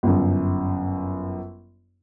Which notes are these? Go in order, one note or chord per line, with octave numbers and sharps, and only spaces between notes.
G1 F#2